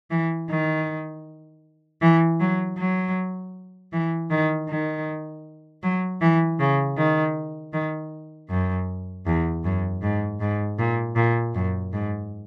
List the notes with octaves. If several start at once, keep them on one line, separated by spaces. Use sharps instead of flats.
E3
D#3
E3
F#3
F#3
E3
D#3
D#3
F#3
E3
C#3
D#3
D#3
F#2
E2
F#2
G#2
G#2
A#2
A#2
F#2
G#2